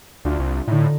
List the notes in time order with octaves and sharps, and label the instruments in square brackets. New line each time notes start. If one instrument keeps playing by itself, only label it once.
[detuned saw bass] D2 [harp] D4 F4
[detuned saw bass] C2
[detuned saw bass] A2 [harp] D3 D#4